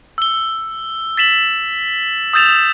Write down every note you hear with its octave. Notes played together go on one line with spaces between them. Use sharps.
E6 G7
A6 B6 E7 F#7
D#6 E6 G6 A6 E7 F7